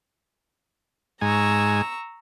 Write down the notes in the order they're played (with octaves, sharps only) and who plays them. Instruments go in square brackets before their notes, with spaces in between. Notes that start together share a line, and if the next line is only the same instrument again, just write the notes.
[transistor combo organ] G#2 G#5 [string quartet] A#5 C#6 E6